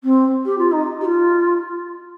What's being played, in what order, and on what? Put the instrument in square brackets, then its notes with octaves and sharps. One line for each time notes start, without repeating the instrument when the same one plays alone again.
[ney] C4
G4
F4
D#4
G4
F4